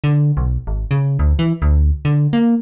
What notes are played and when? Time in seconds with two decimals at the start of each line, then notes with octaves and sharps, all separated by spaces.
0.04 D3
0.37 B1
0.67 G#1
0.91 C#3
1.19 D2
1.39 E3
1.62 D2
2.05 D3
2.33 A#3